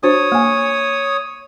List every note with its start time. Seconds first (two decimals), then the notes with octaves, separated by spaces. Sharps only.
0.03 D4 F#4 C5 C#5 D#6
0.32 A#3 G#5